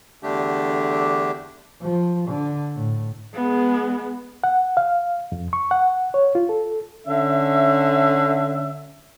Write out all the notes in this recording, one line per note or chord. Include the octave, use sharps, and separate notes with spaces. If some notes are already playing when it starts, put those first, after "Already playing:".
E2 D3 A3 D4 G4
F3
D3
A2
G#3 B3
F#5
F5
F2
C#6
F#5
C#5
F4
A4
D3 C#4 E5